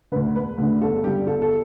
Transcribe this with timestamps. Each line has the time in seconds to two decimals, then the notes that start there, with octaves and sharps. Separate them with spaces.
0.12 D2 D3 B4
0.35 E1 B4
0.58 D2 D3
0.81 G1 A4
1.03 G2 D3 G3 G4
1.27 G1 A4
1.42 A4